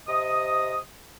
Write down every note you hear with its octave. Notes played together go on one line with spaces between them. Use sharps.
C3 D#5 D#6